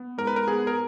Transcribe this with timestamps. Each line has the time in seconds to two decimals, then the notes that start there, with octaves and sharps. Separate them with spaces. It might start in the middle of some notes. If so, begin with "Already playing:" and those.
Already playing: B3
0.18 G#2 A#4
0.27 B4
0.36 A#4
0.48 B3 G#4
0.67 A#4